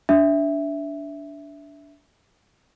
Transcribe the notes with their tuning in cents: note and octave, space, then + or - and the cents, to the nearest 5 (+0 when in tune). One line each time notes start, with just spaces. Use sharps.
D4 -20 E5 +0